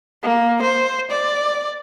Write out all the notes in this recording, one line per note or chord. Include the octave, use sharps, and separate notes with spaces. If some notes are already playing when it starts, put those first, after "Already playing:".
A#3
C5
D5